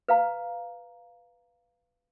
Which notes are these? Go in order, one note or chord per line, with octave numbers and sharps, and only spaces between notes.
B4 F5 A#5